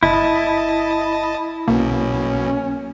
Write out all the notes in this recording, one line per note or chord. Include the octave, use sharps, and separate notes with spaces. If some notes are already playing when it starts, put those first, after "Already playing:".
G1 E4 D#5 A5
B1 B2 A#3 C#4